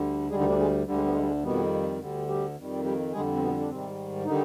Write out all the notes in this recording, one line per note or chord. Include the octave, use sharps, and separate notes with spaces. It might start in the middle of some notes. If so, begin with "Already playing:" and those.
Already playing: D2 D3 G3
D2 D3 G3 G#3 G#4
D#3 D#4
D3 D4
G#3
D2 D3 G3
G#3
B3
G#3
G3
G#3
F2 B2 D#3 G3 B3
D2 D3 G3
G3 G4
F2 D#3 G3
G3 G4
F2 D3 G3 G#3 G#4
C4
B2 B3
D4
G#2 C3 D#3 G3 C4
D3 D#3 G3 D#4